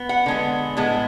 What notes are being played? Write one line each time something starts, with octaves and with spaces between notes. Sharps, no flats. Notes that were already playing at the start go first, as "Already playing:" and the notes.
Already playing: B3
F#5
D3 G#3 B3
A2 G#3 B3